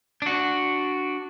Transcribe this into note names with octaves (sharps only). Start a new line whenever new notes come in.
D4 F#4